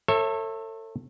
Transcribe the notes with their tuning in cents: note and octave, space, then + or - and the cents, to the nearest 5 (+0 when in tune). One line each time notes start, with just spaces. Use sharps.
A4 +30 C#5 -35 E5 +0